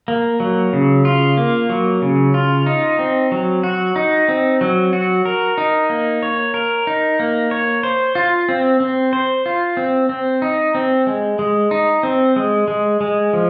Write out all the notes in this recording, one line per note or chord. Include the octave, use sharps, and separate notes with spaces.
A#3
F#3
C#3
F4
A#3
F#3
C#3
F4
D#4
C4
F#3
F#4
D#4
C4
F#3
F#4
A#4
D#4
A#3
C#5
A#4
D#4
A#3
C#5
C5
F4
C4
C4
C5
F4
C4
C4
D#4
C4
G#3
G#3
D#4
C4
G#3
G#3
G#3
F3